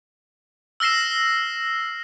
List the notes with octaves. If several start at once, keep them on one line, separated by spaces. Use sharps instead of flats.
E6 F6 A#6 C7 E7